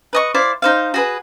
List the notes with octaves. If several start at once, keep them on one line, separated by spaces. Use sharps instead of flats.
B4 D#5 C#6
E4 C5 D5 F5
D#4 C5 F5
F#4 G#4 B4